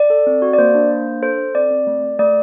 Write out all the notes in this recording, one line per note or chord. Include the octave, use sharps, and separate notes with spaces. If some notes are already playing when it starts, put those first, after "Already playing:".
Already playing: D5
A4
C4
F#4
D5
A#3 C5
D4
A#3
D4
A4 C5
A4
C4 D5
C4
A3
A3
A3 D5